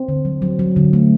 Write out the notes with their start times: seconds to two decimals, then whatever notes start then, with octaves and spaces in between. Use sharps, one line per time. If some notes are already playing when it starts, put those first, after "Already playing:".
Already playing: C4
0.08 D3
0.25 F#3
0.42 F#3
0.59 F#3
0.76 D3
0.93 A3